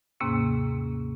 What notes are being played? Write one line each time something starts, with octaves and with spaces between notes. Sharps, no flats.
D#2 G#2 C3 A#3 C#4